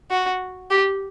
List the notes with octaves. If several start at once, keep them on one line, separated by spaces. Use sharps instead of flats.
F#4
G4